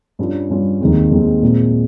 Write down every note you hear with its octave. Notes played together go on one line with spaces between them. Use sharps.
G2 G3 C#4 F4
G2 G3 C#4 F4
D#2 D#3 G#3 C4
D#2 D#3 G#3 C4
A#2 G#3 C4